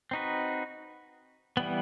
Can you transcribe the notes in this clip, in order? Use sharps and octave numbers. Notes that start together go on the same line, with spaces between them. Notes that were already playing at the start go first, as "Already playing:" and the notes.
C4 D#4 F#4 B4
E3 G3 B3